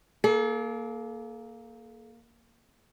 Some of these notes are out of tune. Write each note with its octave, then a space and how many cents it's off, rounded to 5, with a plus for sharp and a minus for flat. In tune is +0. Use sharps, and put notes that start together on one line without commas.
A#3 +0 A4 -45